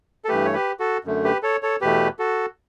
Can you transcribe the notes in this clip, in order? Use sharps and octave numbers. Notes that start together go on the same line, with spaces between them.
A4
G2 E3 A3 G4 B4
C#5
G4 B4
F#4 A4
F#2 D3 A3
G4 B4
A4 C#5
A4 C#5
E2 B2 A3 G4 B4
F#4 A4